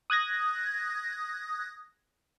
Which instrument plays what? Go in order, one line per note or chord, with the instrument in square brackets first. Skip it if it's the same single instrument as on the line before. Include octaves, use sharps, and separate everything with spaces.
[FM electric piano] D#6 F#6 G#6 A#6